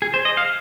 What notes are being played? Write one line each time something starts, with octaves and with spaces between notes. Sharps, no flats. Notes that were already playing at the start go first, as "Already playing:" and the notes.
G#4
C5
D#5
F5